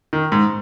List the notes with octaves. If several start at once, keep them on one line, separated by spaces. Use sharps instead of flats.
D#3
G#2